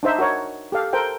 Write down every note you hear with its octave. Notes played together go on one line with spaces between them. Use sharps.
D4 D#4 C5 E5
F#4 A#4 C#5
G4 A4 F5
A4 A#4 C5 G5